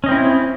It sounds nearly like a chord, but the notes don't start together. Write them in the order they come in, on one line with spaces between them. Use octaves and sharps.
C#4 D#5 C4 E4